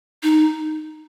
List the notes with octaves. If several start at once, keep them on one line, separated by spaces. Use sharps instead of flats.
D#4